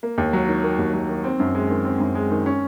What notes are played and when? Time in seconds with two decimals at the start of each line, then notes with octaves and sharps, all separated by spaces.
0.03 A#3
0.18 D#2
0.33 F#3
0.48 D#3
0.63 A#3
0.79 D#2
0.94 F#3
1.09 D#3
1.24 C4
1.40 F#2
1.55 G#3
1.70 D#3
1.85 C4
2.00 F#2
2.15 G#3
2.31 D#3
2.46 C#4